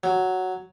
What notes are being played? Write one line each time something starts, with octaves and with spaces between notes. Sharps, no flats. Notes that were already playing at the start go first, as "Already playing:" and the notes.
F#3